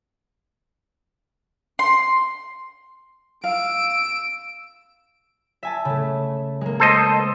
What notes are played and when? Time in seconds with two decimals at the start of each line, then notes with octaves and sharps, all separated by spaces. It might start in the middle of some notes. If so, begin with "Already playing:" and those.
1.79 C6
3.44 F5 E6 D7
5.63 E5 G#5 A5
5.85 C#3 A3
6.61 G#3 A#3
6.80 A4 C5 D#5